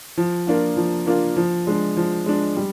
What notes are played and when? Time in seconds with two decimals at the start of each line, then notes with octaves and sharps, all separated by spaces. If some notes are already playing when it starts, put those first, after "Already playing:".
0.17 F3
0.47 A#3 D4 F4
0.77 F3
1.07 A#3 D4 F4
1.36 F3
1.67 G#3 D4
1.97 F3
2.26 G#3 D4
2.57 G3